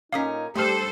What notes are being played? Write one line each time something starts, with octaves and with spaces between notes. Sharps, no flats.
A#2 C#4 D#4 A#4 F5 D#6 B6
G2 G3 A3 G4 A4 C5 C6 F6